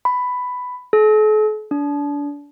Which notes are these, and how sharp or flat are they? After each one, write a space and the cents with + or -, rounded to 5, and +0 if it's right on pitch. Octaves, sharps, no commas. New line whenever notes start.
B5 +10
A4 -45
D4 -30